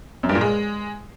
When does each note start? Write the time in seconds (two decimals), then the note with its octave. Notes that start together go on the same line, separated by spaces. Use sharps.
0.23 F#2
0.29 G2
0.35 A#2
0.41 G#3